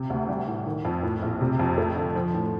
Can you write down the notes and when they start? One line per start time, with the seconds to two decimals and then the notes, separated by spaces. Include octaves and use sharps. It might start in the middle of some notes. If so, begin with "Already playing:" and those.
Already playing: C3
0.10 D2
0.29 G3
0.47 A2
0.66 D#3
0.85 F2
1.03 A2
1.22 A#1
1.41 C3
1.59 F2
1.78 A3
1.96 D3
2.15 F3
2.35 A2